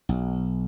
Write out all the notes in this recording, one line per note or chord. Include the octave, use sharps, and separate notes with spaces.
B1